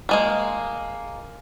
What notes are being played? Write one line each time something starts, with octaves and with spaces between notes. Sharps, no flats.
G3 G#3 A#3